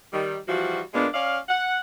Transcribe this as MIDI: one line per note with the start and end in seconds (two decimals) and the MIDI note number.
0.13 0.37 51
0.13 0.37 55
0.48 0.81 52
0.48 0.81 53
0.48 0.81 55
0.48 0.81 66
0.94 1.08 46
0.94 1.08 56
0.94 1.08 58
0.94 1.08 59
0.94 1.08 62
1.14 1.39 61
1.14 1.39 74
1.14 1.39 77
1.49 1.81 78